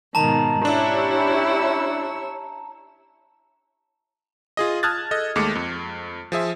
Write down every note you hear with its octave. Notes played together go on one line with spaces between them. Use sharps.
G#2 B2 D#3 A5 A#5
C#4 D4 E4 G4 C#5 E6
F4 G#4 D#5
A5 D#6 F6 F#6 G#6 A6
A4 D#5
D#2 G#3 A3 D6 C#7
F2
F3 G#4 E5